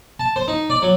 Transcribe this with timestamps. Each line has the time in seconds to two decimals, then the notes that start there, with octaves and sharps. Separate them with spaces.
0.20 A5
0.36 C5
0.48 D#4
0.70 D5
0.82 F#3